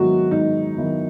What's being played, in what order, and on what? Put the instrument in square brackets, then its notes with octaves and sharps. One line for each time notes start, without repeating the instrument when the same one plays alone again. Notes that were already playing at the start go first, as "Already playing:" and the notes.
Already playing: [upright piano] G#2 D#3 F#3 B3 E4 [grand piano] F#4
[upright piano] G#2 [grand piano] D#4
[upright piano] D#3 F#3 B3 E4